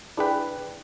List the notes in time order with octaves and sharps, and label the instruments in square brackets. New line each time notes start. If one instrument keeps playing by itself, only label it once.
[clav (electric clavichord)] D4 B4 [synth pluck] E4 G#4 G5